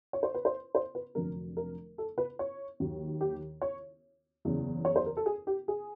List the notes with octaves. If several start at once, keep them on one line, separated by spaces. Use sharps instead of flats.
C#5
C5
B4
C5
C5
B4
F1 F2 D3 F#3 A#4
A#4
A4
B4
C#5
D#2 D#3 F#3
G4
C#5
F#1 E2 C#3
C#5
C5
A#4
A4
G#4
G4
G#4